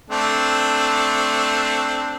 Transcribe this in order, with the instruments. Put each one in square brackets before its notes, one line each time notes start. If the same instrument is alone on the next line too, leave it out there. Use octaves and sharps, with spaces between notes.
[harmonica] A3 C4 D4